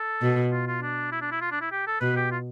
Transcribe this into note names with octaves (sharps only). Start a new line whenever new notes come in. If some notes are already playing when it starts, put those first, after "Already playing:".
Already playing: A4
B2
F4
F4
D4
E4
D4
E4
F4
D4
E4
G4
A4
B2 B4
G4
F4